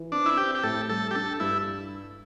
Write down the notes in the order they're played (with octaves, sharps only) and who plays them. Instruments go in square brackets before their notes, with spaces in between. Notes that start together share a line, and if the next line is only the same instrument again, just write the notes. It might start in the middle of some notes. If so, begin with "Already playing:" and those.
Already playing: [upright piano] E3
[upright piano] C4 [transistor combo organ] D4
[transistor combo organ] E4
[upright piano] C4 [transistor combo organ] G4
[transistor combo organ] G4
[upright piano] A2 [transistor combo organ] A4
[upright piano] G3 [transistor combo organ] A4
[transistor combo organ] G4
[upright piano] D4 [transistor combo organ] A4
[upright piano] G2 [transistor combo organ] E4